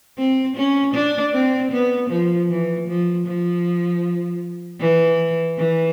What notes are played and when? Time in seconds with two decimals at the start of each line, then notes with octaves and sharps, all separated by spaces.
0.18 C4
0.57 C#4
0.94 D4
1.33 C4
1.71 B3
2.10 F3
2.50 E3
2.88 F3
3.27 F3
4.80 E3
5.58 E3